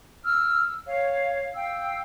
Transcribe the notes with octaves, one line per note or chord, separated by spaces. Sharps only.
E6 F6
C#5 F5
F5 G5 E6